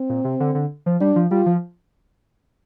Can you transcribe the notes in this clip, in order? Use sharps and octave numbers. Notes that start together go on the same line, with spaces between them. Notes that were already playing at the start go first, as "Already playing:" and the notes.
Already playing: C4
A#2
C3
D3
D3
F3
G3 D4
F3
G3 F4
F3